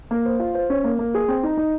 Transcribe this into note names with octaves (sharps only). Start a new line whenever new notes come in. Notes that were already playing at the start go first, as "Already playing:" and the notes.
A#3
C5
F4
C5
C#4
A#3
A#3
G#4
C4
D#4
D#4